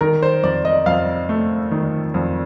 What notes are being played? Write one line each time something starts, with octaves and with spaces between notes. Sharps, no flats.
D#3 A#4
C5
F2 D5
D#5
F2 F5
A3
D#3
F2